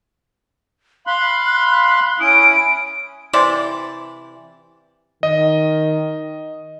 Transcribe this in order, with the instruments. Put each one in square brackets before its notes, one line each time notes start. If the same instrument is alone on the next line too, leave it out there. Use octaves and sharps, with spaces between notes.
[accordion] F5 B5 C6 [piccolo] F#6
[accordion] C#4 E4 D#6 [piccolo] D7
[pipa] C3 E3 D5 C6
[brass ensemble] D#3 [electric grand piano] D#5